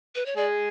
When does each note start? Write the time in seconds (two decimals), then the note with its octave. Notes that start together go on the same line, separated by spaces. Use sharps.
0.15 B4
0.26 C#5
0.37 G#3 G#4 D5